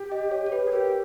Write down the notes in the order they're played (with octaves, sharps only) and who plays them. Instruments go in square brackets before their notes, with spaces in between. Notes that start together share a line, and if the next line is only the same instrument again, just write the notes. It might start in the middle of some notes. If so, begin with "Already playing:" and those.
Already playing: [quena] G4
[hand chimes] D#5
C#5
C#5
B4
[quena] G#4
[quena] G4 [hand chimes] A#4